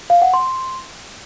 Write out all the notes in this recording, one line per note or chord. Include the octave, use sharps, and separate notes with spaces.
F5
F#5
C6